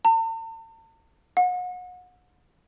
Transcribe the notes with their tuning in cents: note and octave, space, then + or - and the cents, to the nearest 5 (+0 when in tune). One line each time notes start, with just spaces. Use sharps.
A5 +45
F#5 -35